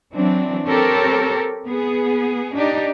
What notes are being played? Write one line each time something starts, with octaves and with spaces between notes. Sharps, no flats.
E3 F#3 C4 D4
C4 G4 A4 A#4 C#5
B3 G#4
D4 D#4 G4 D5